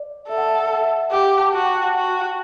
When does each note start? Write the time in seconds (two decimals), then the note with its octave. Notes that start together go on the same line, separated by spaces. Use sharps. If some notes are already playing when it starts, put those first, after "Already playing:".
Already playing: D5
0.29 A4 E5
0.37 F#5
0.46 E5
0.55 F#5
0.63 E5
0.73 F#5
0.81 E5
1.11 G4 F#5
1.21 F#5
1.26 G5
1.39 A5
1.53 F#4 G5
1.66 A5
1.74 G5
1.95 F#4